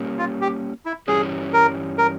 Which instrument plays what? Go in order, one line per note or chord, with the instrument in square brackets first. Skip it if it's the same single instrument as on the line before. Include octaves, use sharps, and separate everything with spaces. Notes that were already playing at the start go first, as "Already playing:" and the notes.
Already playing: [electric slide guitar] G3 A#3 C#4
[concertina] F4
G4
E4
[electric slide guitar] G2 E3 G3 C#4 [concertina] G#4
[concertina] A#4
A#4